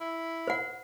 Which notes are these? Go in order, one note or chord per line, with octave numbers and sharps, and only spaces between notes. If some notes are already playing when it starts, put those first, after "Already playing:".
E4
C5 F#5